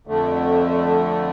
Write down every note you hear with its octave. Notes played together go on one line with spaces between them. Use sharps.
F2 D3 A3